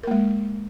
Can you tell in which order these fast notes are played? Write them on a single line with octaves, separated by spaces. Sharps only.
A#4 A#3 G#3